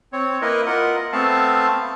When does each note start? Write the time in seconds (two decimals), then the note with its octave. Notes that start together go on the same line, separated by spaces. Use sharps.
0.13 C4 C#5
0.42 A#3 E4 A#4 B4 D#5
0.66 F4 A#4 D#5 F#5
1.12 A3 B3 C4 F5 A5